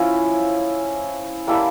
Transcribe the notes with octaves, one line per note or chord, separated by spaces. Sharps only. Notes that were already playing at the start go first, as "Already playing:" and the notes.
Already playing: F3 C#4 E4
G3 A#3 E4 A4